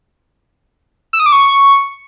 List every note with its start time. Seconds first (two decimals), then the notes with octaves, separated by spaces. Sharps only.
1.13 E6
1.20 D#6
1.26 D6
1.32 C#6